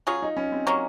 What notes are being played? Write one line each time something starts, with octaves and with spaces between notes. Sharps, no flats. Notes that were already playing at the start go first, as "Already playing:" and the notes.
F#3 C#4 F4 G#4
D#4
C#4
C4
F#3 A#3 C#4